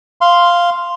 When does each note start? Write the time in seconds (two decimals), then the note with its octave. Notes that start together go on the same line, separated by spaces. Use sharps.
0.21 F5 C6